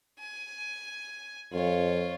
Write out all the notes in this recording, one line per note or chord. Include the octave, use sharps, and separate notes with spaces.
G#5
F2 F4 C#5